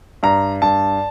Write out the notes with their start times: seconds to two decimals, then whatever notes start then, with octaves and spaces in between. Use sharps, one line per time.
0.23 G2 A#5
0.62 G2 A5